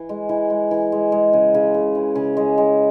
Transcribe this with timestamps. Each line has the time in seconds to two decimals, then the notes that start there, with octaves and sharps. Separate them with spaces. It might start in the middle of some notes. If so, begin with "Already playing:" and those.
Already playing: E3
0.09 G#3
0.29 E3
0.50 G#3
0.71 E3
0.92 G#3
1.12 G#3
1.33 C#3
1.54 C#3
1.74 C#3
1.95 E3
2.15 C#3
2.37 G#3
2.58 G#3